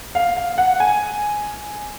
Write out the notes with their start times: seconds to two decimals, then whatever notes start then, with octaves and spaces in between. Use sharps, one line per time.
0.15 F5
0.37 F5
0.58 F#5
0.80 G#5